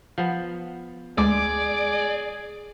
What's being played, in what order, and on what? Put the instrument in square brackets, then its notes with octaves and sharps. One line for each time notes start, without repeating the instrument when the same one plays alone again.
[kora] F3 B3
[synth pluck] D2 G#3 D6 [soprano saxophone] G#4 [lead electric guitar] D5